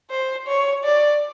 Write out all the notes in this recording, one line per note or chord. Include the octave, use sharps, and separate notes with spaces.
C5
C#5
D5